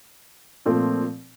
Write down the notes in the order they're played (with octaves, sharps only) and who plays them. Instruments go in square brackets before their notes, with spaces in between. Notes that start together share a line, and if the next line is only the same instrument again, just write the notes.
[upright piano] A#2 F3 A3 C4